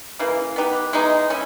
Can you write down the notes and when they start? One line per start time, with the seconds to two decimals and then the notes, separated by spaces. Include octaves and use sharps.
0.19 C#3 E3 A#3
0.56 B3 D#4 G4 B4
0.93 E3 G#3 B3 D#4
1.30 C#4 E4